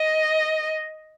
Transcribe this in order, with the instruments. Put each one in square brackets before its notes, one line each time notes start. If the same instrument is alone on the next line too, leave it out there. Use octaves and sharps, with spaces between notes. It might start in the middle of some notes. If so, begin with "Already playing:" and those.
Already playing: [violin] D#5